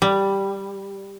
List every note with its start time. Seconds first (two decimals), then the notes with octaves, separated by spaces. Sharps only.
0.02 G3